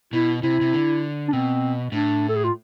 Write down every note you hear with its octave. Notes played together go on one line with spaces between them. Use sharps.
B2 E4
C3 E4
C3
D3
D4
B2 C4
A2 D4
A4
G#4
F4